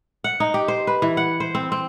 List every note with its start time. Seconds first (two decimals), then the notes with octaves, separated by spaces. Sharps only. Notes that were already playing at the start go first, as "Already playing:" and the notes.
0.24 F#5
0.40 D#4
0.54 G4
0.68 C5
0.87 B4
1.02 E3
1.17 F#5
1.40 C5
1.55 C4
1.72 C4